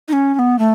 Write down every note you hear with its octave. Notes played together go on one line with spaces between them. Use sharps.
D#4
C#4
C#4
B3
A3